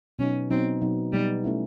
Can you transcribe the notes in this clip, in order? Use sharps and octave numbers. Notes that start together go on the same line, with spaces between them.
B2 F#3 B3 C#4 D#4
B2 F#3 B3 C4 D#4
B2 F#3 B3 D#4
B2 F#3 G3 B3 D#4
A3 C#4 E4